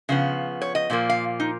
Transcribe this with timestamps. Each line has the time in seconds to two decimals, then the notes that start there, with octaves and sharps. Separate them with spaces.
0.09 C#3 F3 B3
0.62 C#5
0.75 D#5
0.90 A#2 F3 A#3
1.10 F5
1.40 D#4